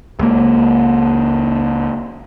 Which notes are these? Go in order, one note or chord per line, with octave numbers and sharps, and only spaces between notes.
C#2 A#3